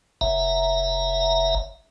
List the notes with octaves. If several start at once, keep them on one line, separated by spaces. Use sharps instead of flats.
F#1 E5 A#5